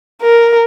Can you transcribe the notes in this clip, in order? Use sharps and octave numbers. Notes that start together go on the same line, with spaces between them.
A#4